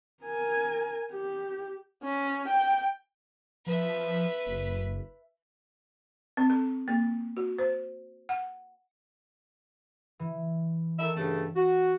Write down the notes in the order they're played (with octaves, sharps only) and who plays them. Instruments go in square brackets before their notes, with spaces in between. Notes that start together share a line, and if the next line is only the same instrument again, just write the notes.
[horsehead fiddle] A#4 G#5
G4
[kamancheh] C#4
G5
[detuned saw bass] F3 [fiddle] B4 E5
[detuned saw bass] F#1
[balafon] C4
A4
A#3
F#4
C5
F#5
[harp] E3
[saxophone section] D#3 A4 E5
G2 C#3 A3
F#4